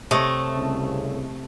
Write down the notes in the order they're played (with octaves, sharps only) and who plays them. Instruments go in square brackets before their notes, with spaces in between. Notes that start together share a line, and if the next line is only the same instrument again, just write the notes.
[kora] C3 C#5 [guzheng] A3 [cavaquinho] A4 D#5
[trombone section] C2 C#3